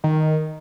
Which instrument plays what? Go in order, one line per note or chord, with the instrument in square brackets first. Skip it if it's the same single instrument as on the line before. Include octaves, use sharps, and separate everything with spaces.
[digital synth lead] D#3